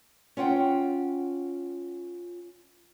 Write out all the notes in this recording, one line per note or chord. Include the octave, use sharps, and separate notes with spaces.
C#4 F4 F#5 G5